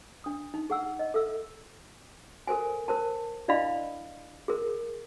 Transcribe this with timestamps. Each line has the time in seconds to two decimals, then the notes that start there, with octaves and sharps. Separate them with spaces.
0.24 D4 D#6
0.54 D#4
0.70 G#4 F#5 E6
0.99 D#5
1.14 A4 E5 E6
2.47 A4 A#4 C5 G#5
2.88 A#4 C5 A5
3.48 D4 E4 D5 D#5 F5 B5
4.48 G#4 A#4